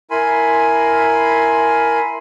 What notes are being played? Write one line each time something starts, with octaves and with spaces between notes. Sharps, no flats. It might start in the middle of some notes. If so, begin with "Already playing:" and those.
E4 A#4 G#5 B5 C6